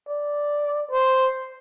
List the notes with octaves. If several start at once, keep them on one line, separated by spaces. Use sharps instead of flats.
D5
C5